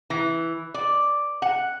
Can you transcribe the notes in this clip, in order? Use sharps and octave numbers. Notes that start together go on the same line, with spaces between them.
E3
D5
F#5